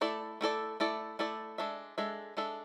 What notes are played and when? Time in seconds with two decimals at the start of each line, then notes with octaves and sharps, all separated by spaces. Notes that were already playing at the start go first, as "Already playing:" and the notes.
0.01 A3 E4 A4 D5
0.41 A3 E4 A4 D5
0.80 A3 E4 A4 D5
1.19 A3 E4 A4 D5
1.58 G#3 D4 A4 E5
1.98 G#3 D4 A4 E5
2.37 G#3 D4 A4 E5